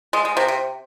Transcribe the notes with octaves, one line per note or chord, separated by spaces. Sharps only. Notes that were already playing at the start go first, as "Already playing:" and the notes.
G#3
G#3
C3
C3